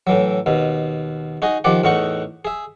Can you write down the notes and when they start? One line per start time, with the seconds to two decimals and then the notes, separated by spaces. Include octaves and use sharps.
0.07 A2 E3 F#3
0.46 D#2 B2
1.42 D#4 F#4 G#4 D#5
1.64 D#3 F3 G4 D5 F#5
1.84 E2 A2 D#4 F#4 F#5 C#6
2.45 G#4 E5